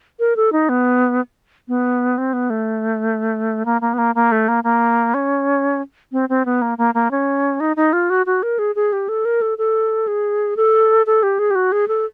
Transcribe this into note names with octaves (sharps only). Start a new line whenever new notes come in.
A#4
A4
D#4
B3
B3
C4
B3
A3
A#3
A#3
B3
A#3
A#3
A3
A#3
A#3
C#4
C4
C4
B3
A#3
A#3
A#3
C#4
D#4
D#4
F4
F#4
F#4
A#4
G#4
G#4
G4
A4
A#4
A4
A4
G#4
A4
A4
G4
G#4
G4
F#4
G#4
A4